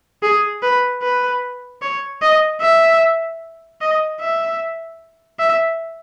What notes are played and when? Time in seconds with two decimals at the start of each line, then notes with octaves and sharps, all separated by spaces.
0.23 G#4
0.63 B4
1.02 B4
1.82 C#5
2.22 D#5
2.62 E5
3.81 D#5
4.21 E5
5.40 E5